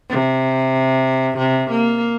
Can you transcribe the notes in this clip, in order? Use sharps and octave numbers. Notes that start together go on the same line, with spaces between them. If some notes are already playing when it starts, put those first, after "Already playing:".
C3
C3
A#3